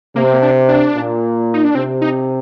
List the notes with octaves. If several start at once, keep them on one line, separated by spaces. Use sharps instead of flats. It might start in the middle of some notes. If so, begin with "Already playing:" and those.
C3 A#3
C4
A#3
D4
D4
A#2
D#4
D4
C3 C4
D#4